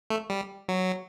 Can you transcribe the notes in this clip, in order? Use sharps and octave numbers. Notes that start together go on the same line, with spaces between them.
A3
G3
F#3